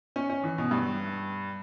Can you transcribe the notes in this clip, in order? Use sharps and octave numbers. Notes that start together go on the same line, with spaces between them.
C#4
C#4
E3
B2
G2